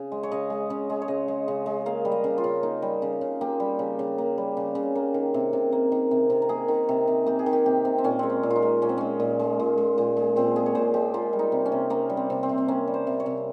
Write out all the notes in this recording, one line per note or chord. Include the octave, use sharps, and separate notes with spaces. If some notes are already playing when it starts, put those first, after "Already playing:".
Already playing: C#3 G#4
G#3
C#5
C#3 D#5
G#3
C#3
G#3
C#5
C#3 D#5
G#3
C#3
G#3
A#3 F5
G3
D#5
C#3
F4
C#3
A#3 D#4
G3
C#3
C#3
A#3 G4
G3
C#3
C#3
A#3
G3
C#3
C#3
A#3
D#3
C3
C3
A#3
D#3
C3
C3
A#4
A#3 G#4
D#3
C3
C3
A#3 G4
G#4
D#3
G4
C3 G4
C3
C4
A#2 C#4
G#3 C4
C#4
A#2
F4
D#4
G#3
A#2 C#4
C4
G#3 C#4
A#2
G#3
A#2
G#3
A#2
G#3
A#2 C4
G#3 G#4
C#5
A#2 C5
G#3 G4
A#3 F4
G3
D#4
C3
C#4
C3
A#3 C#4
G3
C4
C3
C4
C3
C4
A#3 C#4
G3
C5
C3
C#5
C3